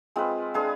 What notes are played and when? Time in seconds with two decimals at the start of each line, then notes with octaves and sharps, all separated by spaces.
0.16 G#3 C4 F4 B4
0.54 D4 G#4 B4 F5